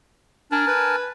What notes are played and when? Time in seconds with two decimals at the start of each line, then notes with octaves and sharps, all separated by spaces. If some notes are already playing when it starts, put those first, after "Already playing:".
0.52 D4 A#4 G#5 A5
0.67 B4